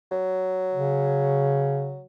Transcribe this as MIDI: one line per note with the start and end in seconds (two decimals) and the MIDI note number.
0.12 2.06 54
0.74 2.01 49